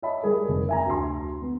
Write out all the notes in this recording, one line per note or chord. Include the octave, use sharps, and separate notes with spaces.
C#5 D#5 E5 A5 B5
G3 G#4 A#4
F1
E5 G#5 A#5
D2 A5 C6
B3